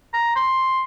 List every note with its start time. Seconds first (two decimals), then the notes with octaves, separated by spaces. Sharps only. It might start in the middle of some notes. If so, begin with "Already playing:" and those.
0.14 A#5
0.36 C6